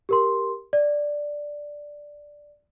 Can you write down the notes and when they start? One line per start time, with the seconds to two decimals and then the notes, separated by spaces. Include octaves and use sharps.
0.09 G4 A#4 C6
0.73 D5